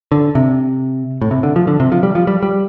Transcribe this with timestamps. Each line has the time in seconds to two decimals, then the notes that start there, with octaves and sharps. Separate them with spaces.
0.12 D3
0.35 C3
1.21 A2
1.31 C3
1.43 D3
1.56 F3
1.67 D3
1.80 C3
1.92 F3
2.03 G3
2.15 F3
2.27 G3
2.43 G3